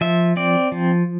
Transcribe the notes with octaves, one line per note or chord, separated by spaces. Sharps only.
F3 E5
C4 D5
F3